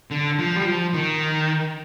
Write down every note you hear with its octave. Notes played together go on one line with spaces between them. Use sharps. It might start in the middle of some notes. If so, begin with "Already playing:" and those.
D3
F3
G3
F3
D#3